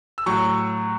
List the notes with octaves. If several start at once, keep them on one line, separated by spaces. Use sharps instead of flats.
E6
A2 F#3 C#6